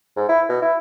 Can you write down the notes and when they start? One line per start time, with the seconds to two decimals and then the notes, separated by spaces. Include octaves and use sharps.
0.16 G#2
0.29 E4
0.49 B2
0.62 E4